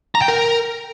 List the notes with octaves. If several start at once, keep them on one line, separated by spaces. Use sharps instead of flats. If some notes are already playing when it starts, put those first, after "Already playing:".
A#5
G5
A#4